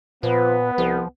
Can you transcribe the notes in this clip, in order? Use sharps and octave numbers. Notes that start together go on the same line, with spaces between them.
A#2 F3 B3 B4
C2 F3